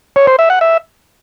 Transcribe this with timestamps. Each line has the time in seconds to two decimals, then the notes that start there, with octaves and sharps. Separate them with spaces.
0.16 C#5
0.27 C5
0.39 E5
0.50 F#5
0.61 E5